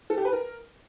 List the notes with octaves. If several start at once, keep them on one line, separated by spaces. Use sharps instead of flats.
A4
G4
B4
A#4